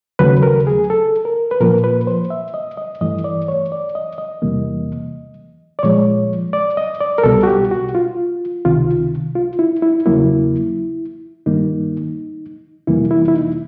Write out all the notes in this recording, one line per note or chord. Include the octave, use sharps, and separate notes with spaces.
D#2 C#3 F#3 A3 B4
A#4
G#4
A4
A#4
B4
A#2 F3 A#3 A#4
B4
C5
E5
D#5
D#5
G2 E3 A3 D#5
D5
C#5
D5
D#5
D#5
E2 C3 E3 G3 A#3
D5
A#2 F3 G#3 C#5
D5
D#5
D5
A#4
C2 B2 G3 A4
F#4
G4
F#4
F4
C#2 C3 D#3 F4
F4
E4
E4
E2 C#3 F#3 A#3 E4
G2 D#3 G3 A#3 D#4
F2 C3 E3 G3 A#3 E4
E4
E4
D#4